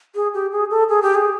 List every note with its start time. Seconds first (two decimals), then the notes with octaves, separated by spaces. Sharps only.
0.15 G#4
0.34 G4
0.52 G#4
0.71 A4
0.89 G#4
1.02 G4
1.15 G#4